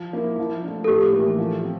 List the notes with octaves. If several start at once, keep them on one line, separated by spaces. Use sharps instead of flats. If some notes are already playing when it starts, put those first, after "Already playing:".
Already playing: F3
A#3 E4
F3
A3 D4
A4
A2 G4
E3 A#3
F3
C4